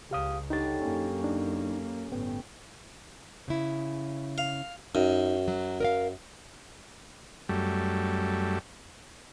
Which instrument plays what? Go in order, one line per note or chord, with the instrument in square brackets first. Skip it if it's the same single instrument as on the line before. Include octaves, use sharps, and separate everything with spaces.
[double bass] C#2 [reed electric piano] G4 F5 D#6
[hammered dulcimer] D3 G3 C#5 [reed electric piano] D#4 A6
[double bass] F#2 A#3 [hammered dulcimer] C#4
[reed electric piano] D4 D#4
[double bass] G1 A2 [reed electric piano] B3 [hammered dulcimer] G5
[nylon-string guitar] C#3 E4
[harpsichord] F5
[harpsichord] F#2 [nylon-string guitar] D#4
[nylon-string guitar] F#3
A#4 D#5 F5
[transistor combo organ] F#2 G3 A3